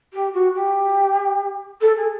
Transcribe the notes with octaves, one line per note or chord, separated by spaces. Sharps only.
G4
F#4
G4
A4
G#4